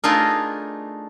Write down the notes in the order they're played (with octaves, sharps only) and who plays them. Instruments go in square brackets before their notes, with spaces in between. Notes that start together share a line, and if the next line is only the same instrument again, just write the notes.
[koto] A3 D4 D#4 F4 G#4 A#4